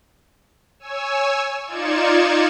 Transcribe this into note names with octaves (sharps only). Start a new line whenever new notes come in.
C#5 G#5 E6
D#4 F4 D5 G#6 C#7 E7